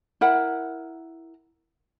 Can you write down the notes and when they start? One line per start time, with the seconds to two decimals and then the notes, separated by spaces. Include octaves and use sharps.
0.21 E4 A#4 F#5